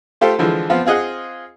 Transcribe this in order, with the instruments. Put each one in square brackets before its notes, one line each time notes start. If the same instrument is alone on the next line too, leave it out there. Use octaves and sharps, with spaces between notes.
[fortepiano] A3 F4 G4 A4 C5
D3 E3 F3 G#3
F3 B3 C4 F4
C4 F4 G#4 D#5 F#5